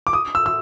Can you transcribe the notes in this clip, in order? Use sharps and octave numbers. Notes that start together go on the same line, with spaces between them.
D6
D#6
E6
E6